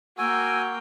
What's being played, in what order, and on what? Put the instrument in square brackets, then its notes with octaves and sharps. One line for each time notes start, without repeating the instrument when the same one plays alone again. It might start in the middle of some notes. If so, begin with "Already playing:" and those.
[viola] A#3 G5 [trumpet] F#4 [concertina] G#5 [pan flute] E6